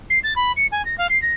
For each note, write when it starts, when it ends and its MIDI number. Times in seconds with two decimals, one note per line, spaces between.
0.10 0.19 96
0.23 0.33 93
0.36 0.52 83
0.56 0.66 97
0.71 0.84 80
0.85 0.97 94
0.98 1.06 77
1.09 1.20 96
1.22 1.34 94